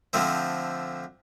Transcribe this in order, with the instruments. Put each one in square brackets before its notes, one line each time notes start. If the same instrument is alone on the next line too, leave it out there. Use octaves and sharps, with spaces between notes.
[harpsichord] D3 F3 A3 C4